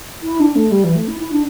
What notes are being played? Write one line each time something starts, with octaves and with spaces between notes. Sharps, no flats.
E4
D4
A3
G3
E3
A3
E4
E4
D4